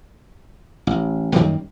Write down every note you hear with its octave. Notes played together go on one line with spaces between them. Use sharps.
A1
F#2 D#3 G3 A#3